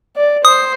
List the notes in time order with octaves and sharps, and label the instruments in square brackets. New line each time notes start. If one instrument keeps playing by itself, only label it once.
[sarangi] D5
[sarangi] C5 [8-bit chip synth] D#6